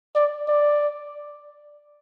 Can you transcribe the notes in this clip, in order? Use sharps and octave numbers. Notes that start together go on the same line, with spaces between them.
D5
D5